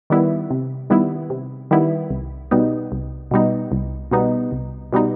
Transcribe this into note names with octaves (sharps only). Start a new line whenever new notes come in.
D#3 G3 B3 E4
C3
D#3 G3 B3 E4
C3
D#3 G3 B3 E4
C2
B2 G3 B3 D#4
C2
B2 G3 B3 D#4
C2
B2 G3 B3 D#4
C2
B2 G3 B3 D#4